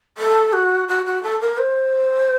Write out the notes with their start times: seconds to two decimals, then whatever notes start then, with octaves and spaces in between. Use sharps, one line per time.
0.18 A4
0.53 F#4
0.88 F#4
1.06 F#4
1.23 A4
1.40 A#4
1.58 C5